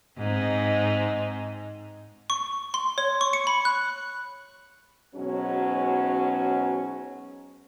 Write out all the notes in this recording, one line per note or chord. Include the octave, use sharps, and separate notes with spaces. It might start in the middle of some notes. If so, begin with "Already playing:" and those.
G#2 C4 D#4
C#6
C6
C#5
C#6
C#7
B5
F#6
G#2 B2 F#3 C#4